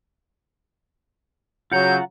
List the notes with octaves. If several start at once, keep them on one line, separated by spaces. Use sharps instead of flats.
C#3 F#3 F4 F#5 A#5 G6